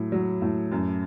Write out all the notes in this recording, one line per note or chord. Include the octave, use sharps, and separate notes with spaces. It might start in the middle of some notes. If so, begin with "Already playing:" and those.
Already playing: A2 F#3
F#3
A2
F#2